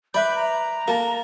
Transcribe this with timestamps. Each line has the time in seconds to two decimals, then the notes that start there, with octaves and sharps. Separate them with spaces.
0.14 B4 D5 E5 B5 G6
0.35 A#5
0.88 A#3 A4 A5